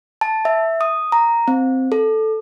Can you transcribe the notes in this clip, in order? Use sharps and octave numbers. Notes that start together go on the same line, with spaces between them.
A5
E5
D#6
A#5
C4
A4